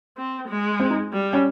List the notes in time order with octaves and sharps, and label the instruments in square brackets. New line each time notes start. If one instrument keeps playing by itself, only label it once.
[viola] C4
G#3
[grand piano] C4
D#4
[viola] G3
[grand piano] C#4